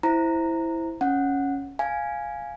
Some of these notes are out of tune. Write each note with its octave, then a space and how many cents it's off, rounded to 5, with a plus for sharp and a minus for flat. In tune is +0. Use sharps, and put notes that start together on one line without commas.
E4 +0 C5 +0 A#5 -15
C#4 +0 F#5 -10
F5 +0 G#5 +0